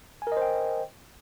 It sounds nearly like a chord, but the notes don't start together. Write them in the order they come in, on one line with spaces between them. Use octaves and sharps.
G#5 A#4 D#5 C5 G5